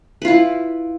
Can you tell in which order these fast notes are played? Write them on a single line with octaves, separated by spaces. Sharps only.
B4 F4 E4